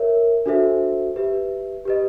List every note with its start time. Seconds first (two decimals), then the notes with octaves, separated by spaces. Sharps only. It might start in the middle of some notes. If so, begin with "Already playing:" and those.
Already playing: A#4 C#5 E5
0.46 D4 F#4 A4 C5 E5
1.16 G4 B4 E5
1.85 G4 B4 D#5